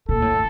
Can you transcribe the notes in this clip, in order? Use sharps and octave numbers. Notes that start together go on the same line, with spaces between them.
A#2 A4
A2